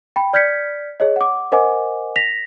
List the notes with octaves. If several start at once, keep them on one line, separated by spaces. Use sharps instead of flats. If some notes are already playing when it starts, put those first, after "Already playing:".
G5 B5
D5 F6 G6 G#6 B6 C#7
G#4 C#5 D#5
F#5 D6
A#4 C5 D#5 F#5 G#5 D6
A#6 B6 F7